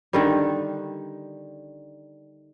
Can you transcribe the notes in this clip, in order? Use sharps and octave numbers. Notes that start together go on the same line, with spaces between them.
D3 D#3 G3